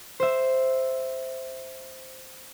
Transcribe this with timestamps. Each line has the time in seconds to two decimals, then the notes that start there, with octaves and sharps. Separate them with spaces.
0.20 C5 E5